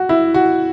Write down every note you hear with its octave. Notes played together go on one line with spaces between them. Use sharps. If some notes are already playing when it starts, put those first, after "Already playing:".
Already playing: F#4
E4
F#4